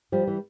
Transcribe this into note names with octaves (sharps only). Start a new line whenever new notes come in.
F3 G3
E3